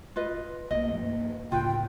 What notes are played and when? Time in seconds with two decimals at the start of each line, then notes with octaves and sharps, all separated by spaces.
0.16 F4 B4 D#5
0.71 B1 A3 A#3 D#5
0.91 G2 F3 A#3
1.52 C#2 A2 C#3 F4 B4 G5